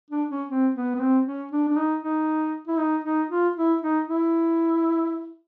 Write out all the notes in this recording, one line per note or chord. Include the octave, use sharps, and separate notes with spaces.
D4
C#4
C4
B3
B3
C4
C#4
D4
D4
D#4
D#4
E4
D#4
D#4
F4
E4
D#4
E4